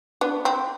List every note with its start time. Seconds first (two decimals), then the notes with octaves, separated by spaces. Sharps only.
0.21 B3 D4
0.45 C4